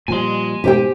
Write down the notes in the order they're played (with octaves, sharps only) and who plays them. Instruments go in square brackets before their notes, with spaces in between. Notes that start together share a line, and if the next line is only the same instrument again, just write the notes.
[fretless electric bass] A#2 F3 G3 [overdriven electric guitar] G#5 C6
[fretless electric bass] G#2 B2 [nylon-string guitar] G4 C5 G5